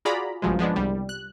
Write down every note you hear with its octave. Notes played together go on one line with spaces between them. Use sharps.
F4 F#4 G#4 D5 A#5 B5
A#1 G2 C#3 F3 F#3 G#3
F3 G#3 B3 D4
C2 G3
F#6